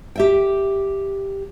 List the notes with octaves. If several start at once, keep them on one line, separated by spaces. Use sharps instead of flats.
G4 E5 G5